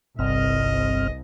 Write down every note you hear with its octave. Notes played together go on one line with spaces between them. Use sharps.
G1 C2 G2 C4 D#5 F6